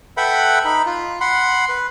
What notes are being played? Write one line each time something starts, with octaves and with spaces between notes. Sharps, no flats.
A4 B4 E5 F#5 G5 B5
D#4 B5
F4
F#5 B5 C6
B4